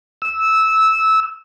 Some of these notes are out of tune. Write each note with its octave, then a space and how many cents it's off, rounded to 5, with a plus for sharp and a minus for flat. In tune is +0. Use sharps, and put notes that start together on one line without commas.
E6 -15